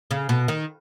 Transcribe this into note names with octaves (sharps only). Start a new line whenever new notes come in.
C#3
B2
D#3